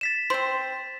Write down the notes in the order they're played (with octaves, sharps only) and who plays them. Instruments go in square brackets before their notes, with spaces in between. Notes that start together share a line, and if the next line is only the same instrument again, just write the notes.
[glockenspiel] A6 B6 E7
[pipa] C4 C5 [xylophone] C6